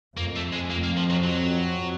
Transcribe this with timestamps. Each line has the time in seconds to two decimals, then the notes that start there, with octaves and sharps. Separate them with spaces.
0.17 F2 A#3
0.36 A3
0.53 G#3
0.70 F2 A#3
0.84 A#3
0.97 F3
1.10 F#3
1.24 F#3